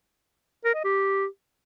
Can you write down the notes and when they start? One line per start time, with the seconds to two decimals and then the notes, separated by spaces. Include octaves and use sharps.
0.65 A#4
0.74 D#5
0.84 G4